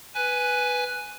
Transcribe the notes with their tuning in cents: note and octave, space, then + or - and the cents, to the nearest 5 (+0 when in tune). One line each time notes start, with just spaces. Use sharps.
B4 +0 G#5 +0